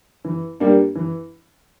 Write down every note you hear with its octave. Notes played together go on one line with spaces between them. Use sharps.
E3
G3 A#3 D4
E3